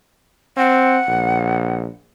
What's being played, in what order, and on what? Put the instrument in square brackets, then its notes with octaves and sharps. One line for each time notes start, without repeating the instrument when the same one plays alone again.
[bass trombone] C4 [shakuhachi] F#5
[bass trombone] A#1